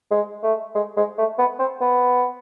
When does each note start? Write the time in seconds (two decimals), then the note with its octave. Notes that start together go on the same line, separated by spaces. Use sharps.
0.11 G#3
0.43 A3
0.75 G#3
0.97 G#3
1.18 A3
1.39 B3
1.59 C4
1.81 B3